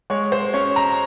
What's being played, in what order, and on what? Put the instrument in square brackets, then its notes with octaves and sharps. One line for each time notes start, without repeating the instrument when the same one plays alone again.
[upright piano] G#3 C#5
C5
C#4 C#5
A#5